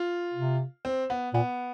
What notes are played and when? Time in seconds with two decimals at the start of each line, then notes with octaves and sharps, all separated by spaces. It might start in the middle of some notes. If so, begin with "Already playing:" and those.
Already playing: F4
0.34 C3
0.85 C4
1.10 B3
1.34 A#2 B3